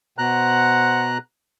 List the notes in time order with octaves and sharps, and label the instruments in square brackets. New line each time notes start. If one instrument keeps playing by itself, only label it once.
[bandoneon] B2 A#5 F#6 [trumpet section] C5 F#5